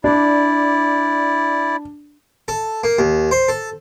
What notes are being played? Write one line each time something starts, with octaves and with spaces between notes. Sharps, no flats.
D4 E4 D5
A4
A#3
D#2
C5
A4